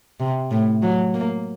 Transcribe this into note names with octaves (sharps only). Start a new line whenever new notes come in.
C3
A2
F#3
A#3